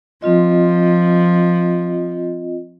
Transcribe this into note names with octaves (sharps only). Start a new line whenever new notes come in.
F3 C4 F4 D#5